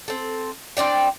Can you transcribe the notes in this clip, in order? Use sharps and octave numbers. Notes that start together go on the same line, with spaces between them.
C4 A4
C4 D4 D5 G5